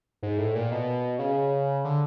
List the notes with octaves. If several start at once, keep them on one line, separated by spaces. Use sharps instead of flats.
G#2
A2
A#2
B2
C#3
D3